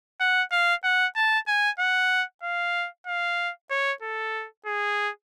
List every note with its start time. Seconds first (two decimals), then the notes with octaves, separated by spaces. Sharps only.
0.20 F#5
0.52 F5
0.84 F#5
1.16 A5
1.48 G#5
1.79 F#5
2.43 F5
3.07 F5
3.71 C#5
4.02 A4
4.66 G#4